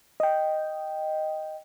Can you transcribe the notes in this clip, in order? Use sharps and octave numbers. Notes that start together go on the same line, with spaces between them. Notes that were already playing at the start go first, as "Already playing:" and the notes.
D#5 G5